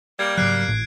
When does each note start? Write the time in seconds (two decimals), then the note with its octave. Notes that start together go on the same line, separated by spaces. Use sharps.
0.19 G3 A#3 G#6
0.38 G#2 C#3 F#3 F#6 C7 D7
0.68 G#1 A2